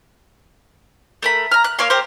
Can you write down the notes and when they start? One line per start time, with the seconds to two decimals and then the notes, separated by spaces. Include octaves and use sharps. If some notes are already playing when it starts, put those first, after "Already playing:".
1.23 A3 A#4 B5
1.51 A#5 F6
1.64 F#6
1.79 A#3 C#5 F5 C6
1.90 G4 A#4 C5